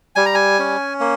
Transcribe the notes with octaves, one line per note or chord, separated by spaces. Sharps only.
G3 G#5
A#5
G#5
C#4
A#3